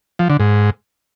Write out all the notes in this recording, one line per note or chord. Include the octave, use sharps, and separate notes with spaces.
F3
D3
G#2